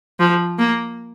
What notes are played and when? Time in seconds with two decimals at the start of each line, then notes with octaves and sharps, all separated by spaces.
0.20 F3
0.59 A#3